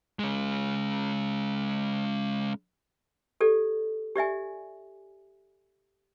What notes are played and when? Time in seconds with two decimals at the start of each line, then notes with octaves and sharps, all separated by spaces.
0.19 G#3 C#4
3.41 G4 A4 D5
4.16 G4 D5 E5 G#5